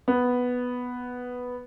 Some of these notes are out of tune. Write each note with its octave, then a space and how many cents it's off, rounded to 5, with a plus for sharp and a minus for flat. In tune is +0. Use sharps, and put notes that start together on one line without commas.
B3 +0